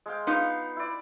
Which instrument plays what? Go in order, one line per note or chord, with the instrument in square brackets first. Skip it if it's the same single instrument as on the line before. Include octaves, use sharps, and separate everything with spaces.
[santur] G#3 F5 G5
[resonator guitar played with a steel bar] B3 D#4 F4 [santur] G5 C6
[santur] E4 D5